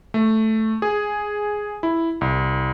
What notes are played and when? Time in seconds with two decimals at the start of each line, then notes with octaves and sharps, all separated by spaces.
0.14 A3
0.82 G#4
1.83 E4
2.21 C2